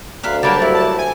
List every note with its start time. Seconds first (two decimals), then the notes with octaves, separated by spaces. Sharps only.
0.23 D2 A#4 B4 F5
0.43 F#3 G3 A#3 D5 A5
0.62 E4
0.75 A5
0.99 G#5